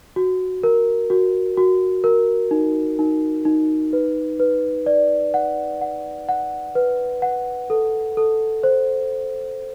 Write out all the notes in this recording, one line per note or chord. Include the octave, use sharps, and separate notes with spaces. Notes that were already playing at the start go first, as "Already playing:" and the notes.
F#4
A#4
F#4
F#4
A#4
D#4
D#4
D#4
B4
B4
D5
F#5
F#5
F#5
B4
F#5
A4
A4
C5